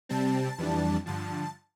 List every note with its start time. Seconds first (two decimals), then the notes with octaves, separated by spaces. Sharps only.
0.09 C3 G3 C4 A5
0.58 F2 E3 G3 D4
1.06 G2 D3 F3 A5